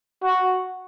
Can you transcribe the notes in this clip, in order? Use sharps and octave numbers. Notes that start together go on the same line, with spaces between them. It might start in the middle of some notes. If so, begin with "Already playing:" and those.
F#4